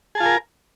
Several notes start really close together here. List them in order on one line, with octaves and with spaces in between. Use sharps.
G#4 A5 F4 G#5 A#4